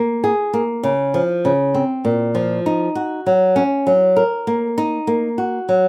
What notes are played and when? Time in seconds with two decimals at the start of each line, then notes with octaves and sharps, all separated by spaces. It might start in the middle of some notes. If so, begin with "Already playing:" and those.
Already playing: A#3
0.24 G#4
0.53 A#3
0.83 C#3
1.14 F3
1.45 C#3
1.74 C4
2.05 A#2
2.35 F3
2.66 D#4
2.95 F#4
3.26 F#3
3.56 C#4
3.87 F#3
4.16 A#4
4.47 A#3
4.78 D#4
5.07 A#3
5.38 F#4
5.69 F#3